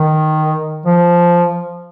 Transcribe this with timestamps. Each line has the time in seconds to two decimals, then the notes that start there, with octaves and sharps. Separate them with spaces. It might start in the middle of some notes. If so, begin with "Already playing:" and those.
Already playing: D#3
0.86 F3